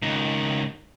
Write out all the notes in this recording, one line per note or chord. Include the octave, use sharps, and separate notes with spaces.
C#2 D#3